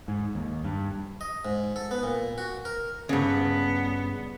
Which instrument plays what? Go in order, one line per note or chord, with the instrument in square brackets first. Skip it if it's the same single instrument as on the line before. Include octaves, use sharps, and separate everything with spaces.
[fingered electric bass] G#2
D#2
G2
[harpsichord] D#5
G#2
A4
B3
A#2
F#4
A#4
[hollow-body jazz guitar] G2 C#3 [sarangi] B3